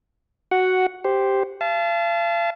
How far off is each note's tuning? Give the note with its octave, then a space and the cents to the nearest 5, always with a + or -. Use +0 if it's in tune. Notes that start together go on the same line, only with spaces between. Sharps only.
F#4 +5 F#5 +0
G4 +0 C5 +0
F5 -40 A5 -20